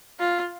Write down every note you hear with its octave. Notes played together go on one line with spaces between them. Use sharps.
F4